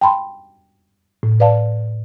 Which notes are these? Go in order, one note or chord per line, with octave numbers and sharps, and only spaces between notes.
G5 A5 B5 C6
A2
B4 D5 F5 A5